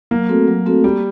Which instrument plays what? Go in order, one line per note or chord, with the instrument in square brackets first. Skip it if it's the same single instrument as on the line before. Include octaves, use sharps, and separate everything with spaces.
[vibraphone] F#3 [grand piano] A#3
[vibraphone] A3 C4 F#4 A4
F#3
A3 C4 F#4 A4
[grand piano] G3 [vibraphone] A#3